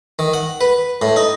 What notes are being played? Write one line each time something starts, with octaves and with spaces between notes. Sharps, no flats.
D#3
F#5
B4
A2
D#4